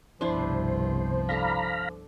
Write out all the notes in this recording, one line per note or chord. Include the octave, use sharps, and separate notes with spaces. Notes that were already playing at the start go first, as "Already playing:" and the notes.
G1 C2 B2 F3 D4 E4 B4 C5
D4 A4 F5 A#5 B5